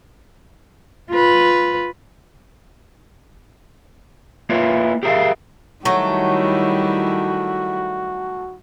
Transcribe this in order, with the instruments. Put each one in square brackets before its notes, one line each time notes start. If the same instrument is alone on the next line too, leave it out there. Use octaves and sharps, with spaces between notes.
[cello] F4 B4
[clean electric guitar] A#3 E4 F4 B4 C#5
G4 G#4 A#4 C5 E5 F5
[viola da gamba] D#3 G3 E4 [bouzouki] F#3 A3 [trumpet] F#4